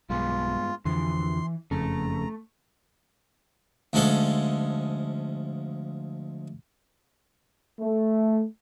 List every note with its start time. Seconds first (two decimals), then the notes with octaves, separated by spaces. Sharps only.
0.10 B1 G2 G#3 B3 F4
0.85 F2 D3 E3 F3 C6
1.71 F#1 F2 C#3 A3 A#5
3.93 D2 F3 G#3 C#4 A4
7.80 A3